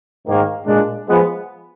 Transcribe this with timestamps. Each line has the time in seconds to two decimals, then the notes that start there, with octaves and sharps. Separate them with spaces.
0.27 G#2 D#3 A#3
0.67 A#2 G#3 D4
1.07 F3 G#3 B3